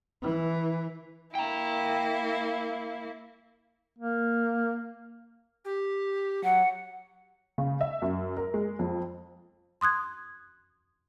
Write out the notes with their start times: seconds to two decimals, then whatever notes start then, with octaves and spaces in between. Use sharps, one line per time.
0.22 E3
1.35 A#3 E4 G5 A#5
3.99 A#3
5.65 G4
6.44 F#3 F#5
7.58 C#3
7.81 E5
8.02 F#2
8.37 A#4
8.54 G#3
8.79 F2
9.81 C6 D#6 F#6 G#6